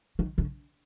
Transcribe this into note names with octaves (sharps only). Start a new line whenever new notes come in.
D#3
D3